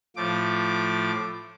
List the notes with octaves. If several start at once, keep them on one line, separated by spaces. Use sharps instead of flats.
A2 F3 D6